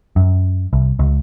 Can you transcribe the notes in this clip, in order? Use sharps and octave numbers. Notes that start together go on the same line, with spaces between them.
F#2
C2
C#2